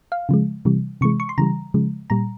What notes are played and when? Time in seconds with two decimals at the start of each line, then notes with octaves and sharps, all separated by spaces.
0.12 F5
0.29 C#3 F3 G#3
0.65 C3 E3 G3
1.01 C3 E3 G#3 C#6
1.20 C#6
1.29 C6
1.38 C#3 E3 G3 A#5
1.74 C#3 F3 G#3
2.10 A#2 G3 A#5